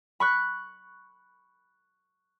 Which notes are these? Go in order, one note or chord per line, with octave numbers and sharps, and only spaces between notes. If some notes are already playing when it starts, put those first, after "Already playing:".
B5 C#6 F#6